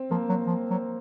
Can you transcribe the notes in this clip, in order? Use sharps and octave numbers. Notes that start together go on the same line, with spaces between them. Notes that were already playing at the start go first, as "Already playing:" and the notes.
Already playing: C4
F3 A#3
F#3
F3
F#3